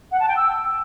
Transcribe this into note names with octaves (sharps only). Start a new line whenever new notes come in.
F#5
A5
G5
E6